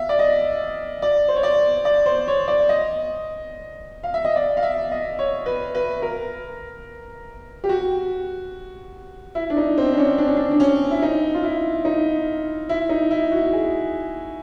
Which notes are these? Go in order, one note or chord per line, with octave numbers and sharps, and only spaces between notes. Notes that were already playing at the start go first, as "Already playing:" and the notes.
Already playing: E5 F5
D5
D#5
D5
C5
C#5
D5
D5
C5
C#5
D5
D#5
F5
E5
D#5
D5
F5
E5
D#5
C#5
B4
B4
A#4
G4
F#4
E4
D4
D#4
C4
D4
C#4
D4
C#4
D4
D4
C#4
E4
D#4
F4
E4
D#4
E4
D#4
E4
F#4
G#4